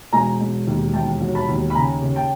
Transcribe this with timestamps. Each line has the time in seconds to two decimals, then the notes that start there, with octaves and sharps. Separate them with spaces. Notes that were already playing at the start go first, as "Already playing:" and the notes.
0.13 E1 G#5 A#5
0.41 E1
0.67 D#2
0.94 E1 G5 A5
1.21 F#3
1.35 A5 B5
1.48 D#2
1.70 B5
1.75 C#3 G#5 A#5
2.02 C#3
2.16 G5 A5